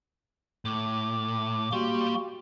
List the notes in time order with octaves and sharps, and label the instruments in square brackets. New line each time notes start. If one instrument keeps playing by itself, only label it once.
[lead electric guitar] A2 [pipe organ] D6
[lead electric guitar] G3 G4 [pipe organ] A#3 F#4 C6